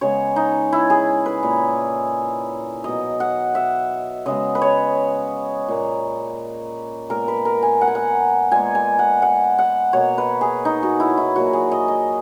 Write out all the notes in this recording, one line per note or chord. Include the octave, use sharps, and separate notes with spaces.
C#3 G#3 B3 C#5
D#4
E4
G#4
B4
A#2 A#3
B2 F#3 B3 D#5
F#5
E5
C#3 G#3 B3 D#5
B4
C#5
A#2 A#3
A#2 G#3 B3 A#4
B4
A#4
G#5
F#5
G#5
F#5
A#2 G#3 B3 G#5
G#5
F#5
F#5
F#5
B2 A#3 C#5
B4
G#4
D#4
F#4
E4
E4
A#2 F#3 A#3 F#4
G#4
D#5
D#5